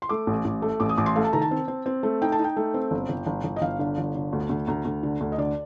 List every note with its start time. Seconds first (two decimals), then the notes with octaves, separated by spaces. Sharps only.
0.02 C6
0.09 A3 D6
0.27 A1
0.45 A1
0.62 A3
0.80 A1 D6
0.89 D#6
0.98 A1 D6
1.06 C6
1.16 A3 F5
1.25 A5
1.33 D#3 A#5
1.42 A5
1.51 C4
1.68 C4
1.86 C4
2.03 A3
2.22 D#4 G5
2.32 A5
2.39 D#4
2.44 G5
2.57 A3
2.74 C4
2.91 G1
3.09 G1
3.26 G1
3.44 G1
3.56 D#5
3.61 G1 F5
3.79 D3 F5
3.98 G1
4.15 D3
4.33 D2
4.50 D2
4.67 D2 A#5
4.85 D2
5.03 D3
5.21 D2
5.32 D#5
5.38 D3 D5